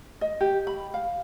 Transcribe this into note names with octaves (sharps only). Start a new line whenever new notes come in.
D#5
G4
B5
F5